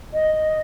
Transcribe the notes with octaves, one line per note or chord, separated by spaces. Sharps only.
D#5